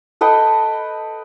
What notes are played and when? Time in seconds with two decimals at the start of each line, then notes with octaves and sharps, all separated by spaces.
0.21 A4 B4 D#5 G5